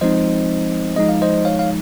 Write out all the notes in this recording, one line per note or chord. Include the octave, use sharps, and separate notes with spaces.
F3 G#3 C4 D#4 C5 D#5
F3 G#3 D#4 D#5
F5
C5 D#5
C#5 F5
F5